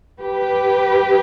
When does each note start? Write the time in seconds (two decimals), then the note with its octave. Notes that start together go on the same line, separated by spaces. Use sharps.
0.21 G4 B4